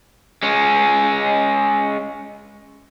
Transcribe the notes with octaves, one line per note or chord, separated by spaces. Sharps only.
G#3 C#4